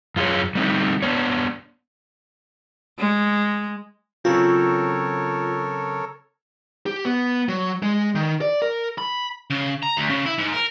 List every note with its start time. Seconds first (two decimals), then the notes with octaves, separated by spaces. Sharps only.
0.16 F#2 F4 G4 G#4 C#5
0.55 G3 A3 C4 D#4
1.02 B3 D4 C#5
2.99 G#3
4.25 C#3 F#3 C4 F4 A4 A#4 C#5
6.86 G4
7.05 B3
7.49 F#3
7.83 G#3
8.15 D#3
8.41 D5
8.62 A#4
8.98 B5
9.50 C#3
9.83 A#5
9.97 D2
10.09 C#3
10.26 E4
10.39 G#2
10.54 A#4